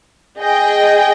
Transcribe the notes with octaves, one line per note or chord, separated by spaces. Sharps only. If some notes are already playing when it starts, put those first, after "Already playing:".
G#4 D#5 G5